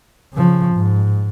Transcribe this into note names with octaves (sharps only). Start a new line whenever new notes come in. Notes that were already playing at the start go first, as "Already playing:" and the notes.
C#3 F3
G#2